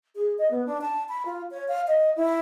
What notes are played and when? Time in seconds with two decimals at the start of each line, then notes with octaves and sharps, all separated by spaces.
0.16 G#4
0.38 D#5
0.51 B3
0.66 D4
0.81 A5
1.09 B5
1.25 F4
1.51 C#5
1.68 F5
1.88 D#5
2.16 E4